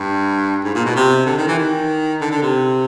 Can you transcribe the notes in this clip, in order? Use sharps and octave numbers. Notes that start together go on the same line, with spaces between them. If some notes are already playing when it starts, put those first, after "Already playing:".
Already playing: G2
G#2
A#2
B2
C3
D3
D#3
E3
D#3
D3
D3
C3